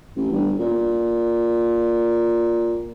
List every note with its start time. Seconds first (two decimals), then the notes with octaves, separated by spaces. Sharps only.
0.16 A1
0.32 G1
0.60 A#2